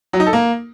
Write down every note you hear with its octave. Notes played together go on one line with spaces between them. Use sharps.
F#3
D#4
A4
A#3